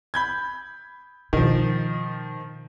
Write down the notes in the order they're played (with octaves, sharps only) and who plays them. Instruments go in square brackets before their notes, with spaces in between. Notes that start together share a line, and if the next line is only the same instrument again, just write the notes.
[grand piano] B5 G6 G#6
[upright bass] B2 [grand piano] D#3 F3